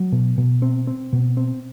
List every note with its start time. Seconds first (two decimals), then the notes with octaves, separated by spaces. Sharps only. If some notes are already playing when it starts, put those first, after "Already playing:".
Already playing: F#3
0.12 B2
0.38 B2
0.62 C4
0.87 C4
1.13 B2
1.37 C4